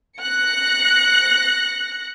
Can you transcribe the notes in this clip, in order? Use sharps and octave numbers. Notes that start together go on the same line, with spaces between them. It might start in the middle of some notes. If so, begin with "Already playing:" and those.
F#6 A#6 C#7